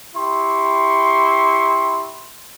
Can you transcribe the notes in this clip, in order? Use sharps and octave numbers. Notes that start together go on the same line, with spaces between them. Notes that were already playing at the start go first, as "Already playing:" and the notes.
E4 G4 C6 C#6